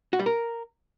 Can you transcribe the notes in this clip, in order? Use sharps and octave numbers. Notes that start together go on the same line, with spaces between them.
F#4
G3
A#4